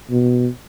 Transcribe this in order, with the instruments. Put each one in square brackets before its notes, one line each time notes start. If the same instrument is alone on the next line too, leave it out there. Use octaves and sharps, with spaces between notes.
[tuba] B2